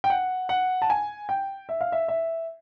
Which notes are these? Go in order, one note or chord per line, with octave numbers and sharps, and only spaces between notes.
G5
F#5
F#5
A5
G#5
G5
E5
F5
E5
E5